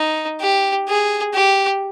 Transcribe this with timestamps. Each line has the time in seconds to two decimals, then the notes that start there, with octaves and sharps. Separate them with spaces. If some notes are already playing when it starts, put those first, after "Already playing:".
Already playing: D#4
0.40 G4
0.88 G#4
1.34 G4